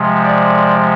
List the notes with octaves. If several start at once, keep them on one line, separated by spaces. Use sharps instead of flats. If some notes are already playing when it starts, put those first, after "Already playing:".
Already playing: C3 F3 G#3
D5